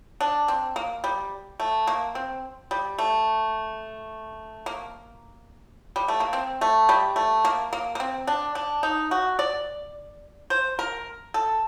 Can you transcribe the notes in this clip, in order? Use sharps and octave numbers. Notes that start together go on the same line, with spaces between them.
D4
C4
A#3
G3
A3
A#3
C4
G3
A3
A#3
G3
A3
A#3
C4
A3
G3
A3
A#3
A#3
A#3
C4
D4
D4
D#4
F#4
D5
C5
A#4
A4